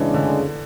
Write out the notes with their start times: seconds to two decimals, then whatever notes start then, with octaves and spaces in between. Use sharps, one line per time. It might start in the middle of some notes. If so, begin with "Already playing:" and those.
Already playing: C#3 E3 G#3 D4 G#4
0.14 D3